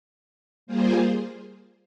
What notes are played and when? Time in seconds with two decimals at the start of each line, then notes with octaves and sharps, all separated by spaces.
0.67 G3 A#3 F4 G#4 C5